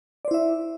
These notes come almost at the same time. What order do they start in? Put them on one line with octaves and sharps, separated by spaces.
D5 C5 E4 E5